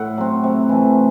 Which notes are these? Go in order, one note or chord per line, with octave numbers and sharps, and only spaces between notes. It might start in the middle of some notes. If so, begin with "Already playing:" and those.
Already playing: A2 E5 F#5
F#3 C4
C3
E3 A3